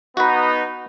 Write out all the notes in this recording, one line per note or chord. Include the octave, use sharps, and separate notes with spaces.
B3 D#4 F#4 B4